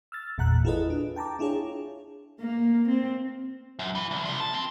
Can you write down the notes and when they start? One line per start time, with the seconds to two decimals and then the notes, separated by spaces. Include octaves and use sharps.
0.12 E6 F6 A6
0.38 G#1 E2 A#2 F#5 A#5 F#6
0.65 E4 F4 G#4 A4 B4 D#5
0.90 D4
1.16 G5 A5 A#5 D6
1.39 D4 E4 F4 G#4 C#5
2.40 A#3
2.89 C4
3.79 F#2
3.95 E3
4.11 C2
4.25 F3 A#3
4.40 A5
4.54 C4